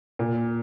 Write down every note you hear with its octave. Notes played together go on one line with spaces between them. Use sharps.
A#2